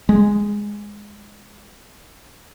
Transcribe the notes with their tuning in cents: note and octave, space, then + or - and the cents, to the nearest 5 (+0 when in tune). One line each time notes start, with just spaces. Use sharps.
G#3 -10